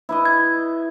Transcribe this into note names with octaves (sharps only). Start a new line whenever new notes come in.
E4 B4 D#5
G#6